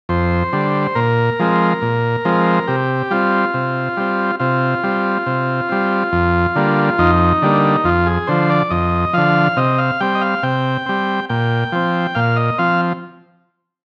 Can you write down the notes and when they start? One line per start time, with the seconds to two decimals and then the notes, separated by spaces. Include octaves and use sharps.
0.09 F2 C5
0.53 D3 G3
0.95 A#2 A#4
1.39 F3 G#3 C4
1.82 A#2
2.25 F3 G#3 C4
2.67 C3 G4
3.11 G3 C4 F4
3.54 C3
3.97 G3 C4
4.40 C3 F4
4.84 G3 C4
5.26 C3
5.69 G3 C4
6.12 F2
6.56 D3 G3 A#3
6.98 F2 D#4
7.42 D3 G3 A#3
7.84 F2 F4
8.06 G#4
8.27 D3 F3 C5
8.50 D5
8.70 F2 D#5
9.13 D3 F3 F5
9.57 C3 D#5
9.78 F5
10.01 G3 C4 G5
10.15 D#5
10.21 F5
10.43 C3 G5
10.86 G3 C4
11.29 A#2 G5
11.72 F3 C4
12.15 A#2 F5
12.36 D#5
12.58 F3 C4 F5